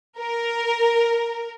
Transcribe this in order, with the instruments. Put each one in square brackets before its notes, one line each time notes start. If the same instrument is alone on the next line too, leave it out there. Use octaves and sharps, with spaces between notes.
[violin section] A#4